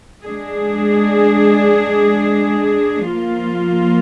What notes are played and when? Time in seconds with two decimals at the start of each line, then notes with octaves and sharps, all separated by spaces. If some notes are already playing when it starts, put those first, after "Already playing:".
0.24 G#3 D4 G#4
3.13 F3 A#3 F4